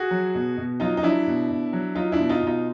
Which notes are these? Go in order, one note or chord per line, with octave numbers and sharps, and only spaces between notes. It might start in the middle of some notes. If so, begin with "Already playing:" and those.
Already playing: F#4 G#4
F#3
B2
B2
F#3 D#4 F4
D#4
F#3 D4 E4
B2
B2
F#3
F#3 D#4 F4
D4 E4
B2
D#4 F4
B2 D#4 F4